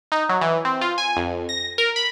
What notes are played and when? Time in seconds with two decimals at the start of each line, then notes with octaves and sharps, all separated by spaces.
0.12 D#4
0.29 F#3
0.41 E3
0.65 C4
0.81 F4
0.98 G#5
1.17 F2
1.49 A#6
1.78 A#4
1.96 B5